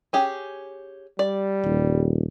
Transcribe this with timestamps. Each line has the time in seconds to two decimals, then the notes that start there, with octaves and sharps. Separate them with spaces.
0.13 C#4 G4 G#4
1.19 G3 D5
1.64 D#1